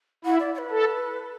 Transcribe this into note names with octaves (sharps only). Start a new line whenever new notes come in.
E4 F#5
D5
D5
B4
A4